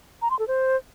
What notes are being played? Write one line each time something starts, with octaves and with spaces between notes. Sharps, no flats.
A#5
C6
A4
C5